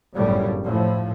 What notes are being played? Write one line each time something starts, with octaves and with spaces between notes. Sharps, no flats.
G1 F#2 A2 C#3 G3
A2 F3